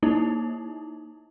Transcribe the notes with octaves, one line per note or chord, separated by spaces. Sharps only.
A#3 D#4 E4